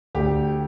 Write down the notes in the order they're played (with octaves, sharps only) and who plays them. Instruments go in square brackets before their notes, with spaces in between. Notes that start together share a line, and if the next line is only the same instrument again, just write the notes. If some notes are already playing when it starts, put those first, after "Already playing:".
[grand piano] D2 [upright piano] G4